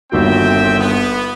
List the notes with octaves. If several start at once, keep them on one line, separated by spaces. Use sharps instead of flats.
G1 D#2 C4 F#4 E5 G5
B3